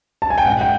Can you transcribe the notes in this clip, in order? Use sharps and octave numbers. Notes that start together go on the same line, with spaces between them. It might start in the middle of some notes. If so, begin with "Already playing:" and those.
A5
G#5
G5
G#2 F#5
G5